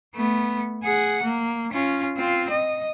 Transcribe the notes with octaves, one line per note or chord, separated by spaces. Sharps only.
A3 B3
G#4 F#5
A#3
C#4 F4
C4 F4
D#5